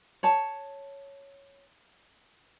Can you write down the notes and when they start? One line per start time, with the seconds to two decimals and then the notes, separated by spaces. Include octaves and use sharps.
0.23 C#5 A5